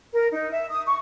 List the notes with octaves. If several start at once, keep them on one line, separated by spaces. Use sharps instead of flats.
A#4
D#4
E5
D#6
C#6